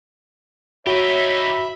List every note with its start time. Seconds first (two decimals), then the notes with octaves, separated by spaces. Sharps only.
0.87 D#4 F#4 G4 C#5 E5 B5